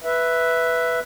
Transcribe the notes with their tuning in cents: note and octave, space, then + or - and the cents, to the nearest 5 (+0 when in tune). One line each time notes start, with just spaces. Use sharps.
B4 +0 E5 +0